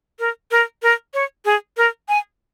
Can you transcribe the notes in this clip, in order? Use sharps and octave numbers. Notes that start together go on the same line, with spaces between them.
A#4
A#4
A#4
C#5
G#4
A#4
G#5